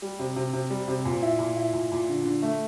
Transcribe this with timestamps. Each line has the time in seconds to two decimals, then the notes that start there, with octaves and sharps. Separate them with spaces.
0.02 G3
0.19 C3
0.36 C3
0.53 C3
0.70 G3
0.88 C3
1.05 A#2
1.22 E4
1.39 A#2
1.57 E4
1.73 A#2
1.92 A#2
2.09 D3
2.25 D3
2.43 A3